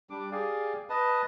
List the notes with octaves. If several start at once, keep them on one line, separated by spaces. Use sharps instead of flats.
G3 D4 D6
G4 G#4 D5 F5
B4 D#5 A5